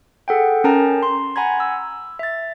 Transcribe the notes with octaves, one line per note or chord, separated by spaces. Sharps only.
G#4 A4 F#5 G5
C#4 A#4 G5 A5 A#5
C6
F#5 G#5 A#5 B5 G#6
E6
E5 A6